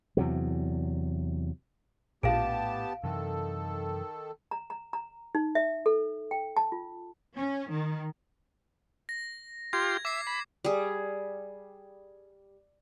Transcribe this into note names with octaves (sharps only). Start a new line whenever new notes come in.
E2 C3 F#3
A#1 A2 B3 G4 F5 A5 D7
F#2 C3 D#3 E3 A4
A#5
A#5
A#5
D#4
E5
A4
G5
A5
F4
C#4
D#3
A#6
F4 G4 C6 G#6
E5 D6 C7
B5
G3 G#4